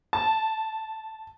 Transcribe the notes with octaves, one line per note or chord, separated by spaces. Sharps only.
A5